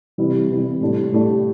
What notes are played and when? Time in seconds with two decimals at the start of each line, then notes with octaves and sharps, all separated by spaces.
0.18 C3 E3 G3 E4
0.50 C3 E3 G3 E4
0.81 A2 A3 D4 G4
1.12 A2 A3 D4 G4